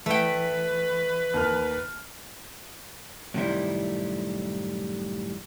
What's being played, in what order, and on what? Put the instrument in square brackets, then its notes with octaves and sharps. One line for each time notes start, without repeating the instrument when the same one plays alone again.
[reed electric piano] E3 [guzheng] A3 G5 [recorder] B4
[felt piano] D#2 A#4 F6
[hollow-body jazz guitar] F#2 A2 C3 D#3 G3 E4